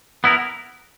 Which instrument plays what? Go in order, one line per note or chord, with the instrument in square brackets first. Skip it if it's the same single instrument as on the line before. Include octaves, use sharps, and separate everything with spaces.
[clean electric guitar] B3 E4 A#4